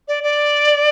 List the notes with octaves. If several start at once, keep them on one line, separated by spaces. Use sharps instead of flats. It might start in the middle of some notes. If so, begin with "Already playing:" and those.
D5
D5